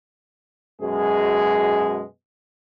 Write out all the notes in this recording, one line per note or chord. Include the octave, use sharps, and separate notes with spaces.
F#2 B2 G#3 G#4